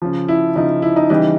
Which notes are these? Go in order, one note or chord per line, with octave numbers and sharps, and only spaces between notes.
C#3 F3
E4
C#3 F3 D#4
E4
D#4
C#3 E3 G3 D#4